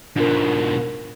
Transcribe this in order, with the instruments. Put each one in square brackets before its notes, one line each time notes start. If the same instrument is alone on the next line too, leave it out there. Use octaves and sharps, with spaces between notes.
[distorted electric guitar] G#2 B2 [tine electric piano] D4 F4 A#4